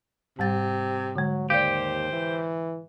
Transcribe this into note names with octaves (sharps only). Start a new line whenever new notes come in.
G#2 C3 G3 A6
D3 F#3 G#3
D#2 G4 C5 D5 F5
E3